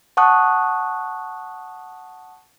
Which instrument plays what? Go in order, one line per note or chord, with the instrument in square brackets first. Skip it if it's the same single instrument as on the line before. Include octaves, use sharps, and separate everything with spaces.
[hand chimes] F#5 A5 C#6 D#6 F#6